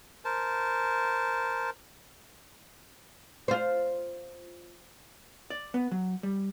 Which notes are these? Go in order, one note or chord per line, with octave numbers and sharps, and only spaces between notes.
A#4 C5 A5
F4 C5
D5
B3
F#3
G3